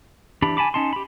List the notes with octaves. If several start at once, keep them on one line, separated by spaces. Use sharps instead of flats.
E3 D4 G4 B5
G#5 A5 B5 D6
C#4 D#4 A5 C6
G4 B5